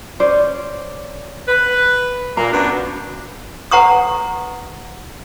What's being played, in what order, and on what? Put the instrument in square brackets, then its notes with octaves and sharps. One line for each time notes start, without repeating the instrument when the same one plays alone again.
[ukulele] C#4 C5 D5
[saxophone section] B4
[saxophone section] A#2 A#3 [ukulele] A#5
[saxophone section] F#2 B3 D4
[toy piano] B4 F#5 A#5 C#6 D#6